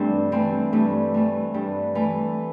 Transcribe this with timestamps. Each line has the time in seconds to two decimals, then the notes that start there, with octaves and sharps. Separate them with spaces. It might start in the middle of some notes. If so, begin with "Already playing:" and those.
Already playing: G2 E3 A3 C4 D4
0.32 E3 A3 C4
0.73 G2 A3
1.14 E3 A3
1.54 G2
1.95 E3 A3